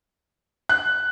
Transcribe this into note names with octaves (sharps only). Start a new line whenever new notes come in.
F#6